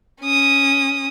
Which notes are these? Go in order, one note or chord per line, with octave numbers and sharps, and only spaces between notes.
C#4 D#6